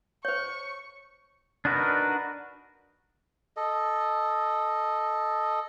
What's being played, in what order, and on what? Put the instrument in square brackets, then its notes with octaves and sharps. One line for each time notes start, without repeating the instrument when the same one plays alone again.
[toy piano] C5 C#5 [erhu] C#6
[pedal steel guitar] D4 D#4 F#4 A#4 B4
[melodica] A4 D#5